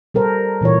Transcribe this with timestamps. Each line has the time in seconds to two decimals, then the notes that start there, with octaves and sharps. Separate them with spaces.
0.14 G3 A4 A#4 C5
0.61 A#2 E3 F4 C#5